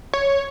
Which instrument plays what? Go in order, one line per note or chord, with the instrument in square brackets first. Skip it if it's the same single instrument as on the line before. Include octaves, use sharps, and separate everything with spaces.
[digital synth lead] C#5